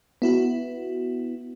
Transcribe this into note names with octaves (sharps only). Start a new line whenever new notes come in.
B3 E4 F#4